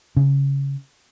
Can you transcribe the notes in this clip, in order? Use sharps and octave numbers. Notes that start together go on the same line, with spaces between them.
C#3